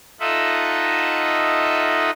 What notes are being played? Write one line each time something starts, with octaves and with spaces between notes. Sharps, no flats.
D#4 F4 A4 D#5 E5 F#5